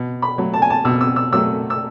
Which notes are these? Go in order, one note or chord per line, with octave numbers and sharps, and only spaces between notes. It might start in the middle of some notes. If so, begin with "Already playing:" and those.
Already playing: B2
B5
F#3 A3
A5
G#5
A5
B2 E6
E6
E6
F#3 A3 E6
E6